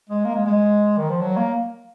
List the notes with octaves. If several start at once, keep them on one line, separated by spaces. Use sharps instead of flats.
G#3
A#3
G#3
G#3
D#3
F3
F#3
A#3